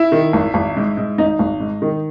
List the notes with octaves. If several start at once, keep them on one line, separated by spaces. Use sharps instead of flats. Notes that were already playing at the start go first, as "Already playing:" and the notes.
Already playing: E4
D#3
G#1
G#1
G#2
G#2
G#1 D#4
G#1
G#2
D#3